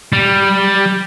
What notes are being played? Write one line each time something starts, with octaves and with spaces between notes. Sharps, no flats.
G3